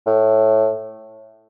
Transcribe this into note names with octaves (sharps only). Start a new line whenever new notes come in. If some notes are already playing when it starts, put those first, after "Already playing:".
A2